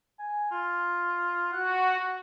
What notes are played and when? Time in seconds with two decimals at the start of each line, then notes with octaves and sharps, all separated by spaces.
0.19 G#5
0.51 F4
1.52 F#4 F#5